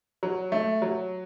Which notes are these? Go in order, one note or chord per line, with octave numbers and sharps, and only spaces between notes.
F#3
A3
F#3